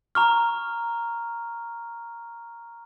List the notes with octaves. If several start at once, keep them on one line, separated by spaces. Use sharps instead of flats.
A#5 C#6 F6